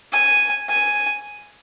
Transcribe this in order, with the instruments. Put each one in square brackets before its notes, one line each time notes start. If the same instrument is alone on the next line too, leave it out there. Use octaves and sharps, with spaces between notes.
[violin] G#5
G#5